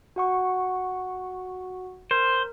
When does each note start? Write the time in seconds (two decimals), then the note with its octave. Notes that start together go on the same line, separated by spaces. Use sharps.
0.16 F#4 F#5 C#6
2.11 A#4 C5